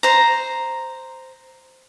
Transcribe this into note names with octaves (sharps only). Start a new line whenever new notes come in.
C5 A#5